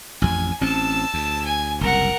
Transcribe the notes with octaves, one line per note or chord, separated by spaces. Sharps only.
A1 F2 G#5
A1 C4 C#4 A5 E6
D2
G#5
F#1 C2 A#4 F#5